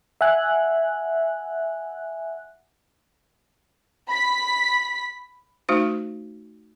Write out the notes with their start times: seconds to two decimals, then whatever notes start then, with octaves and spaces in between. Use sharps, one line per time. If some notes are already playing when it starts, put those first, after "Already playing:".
0.21 E5 F#5 G#5 F#6
4.09 B5 B6
5.69 A3 D#4 F#4 C5